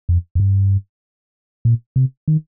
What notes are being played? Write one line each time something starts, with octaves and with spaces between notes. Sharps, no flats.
F2
F2
G2
A#2
C3
D#3